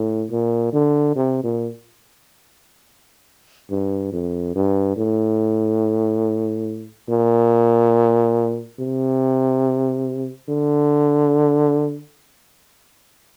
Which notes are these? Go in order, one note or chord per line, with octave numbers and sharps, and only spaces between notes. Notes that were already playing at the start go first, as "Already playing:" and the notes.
Already playing: A2
A#2
D3
C3
A#2
G2
F2
G2
A2
A#2
C3
D3